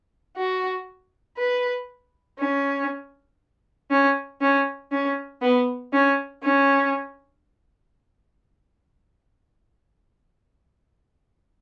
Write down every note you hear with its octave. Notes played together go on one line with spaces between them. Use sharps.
F#4
B4
C#4
C#4
C#4
C#4
B3
C#4
C#4